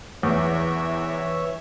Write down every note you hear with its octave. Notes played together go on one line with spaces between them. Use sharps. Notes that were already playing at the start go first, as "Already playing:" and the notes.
E2 E3 C#5 E5